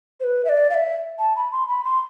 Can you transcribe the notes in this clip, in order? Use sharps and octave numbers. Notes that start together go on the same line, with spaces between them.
C5
B4
E5
D5
F5
E5
A5
B5
C6
B5
C6